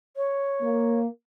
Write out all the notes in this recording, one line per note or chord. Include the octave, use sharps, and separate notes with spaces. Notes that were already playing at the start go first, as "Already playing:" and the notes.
C#5
A#3